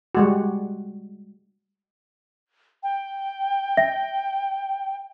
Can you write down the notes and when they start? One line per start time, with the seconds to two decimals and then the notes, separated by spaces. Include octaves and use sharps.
0.15 G3 G#3 F#4
2.83 G5
3.77 E5 A#6